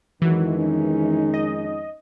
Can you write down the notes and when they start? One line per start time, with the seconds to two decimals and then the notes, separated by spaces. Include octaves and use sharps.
0.22 F2 D#3 E3 F#3 G#3 F#4
0.54 C#4 D#4
1.34 D#5